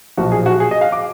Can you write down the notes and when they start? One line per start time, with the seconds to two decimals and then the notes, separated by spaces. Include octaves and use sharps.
0.17 B1 A#2 F3 F#4
0.32 G#4
0.46 F#4
0.60 G#4
0.71 D#5
0.81 F5
0.92 D6